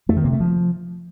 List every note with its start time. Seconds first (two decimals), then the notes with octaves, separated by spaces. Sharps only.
0.09 F2 A3
0.17 D#3
0.24 C3 A#3
0.33 A3
0.40 F3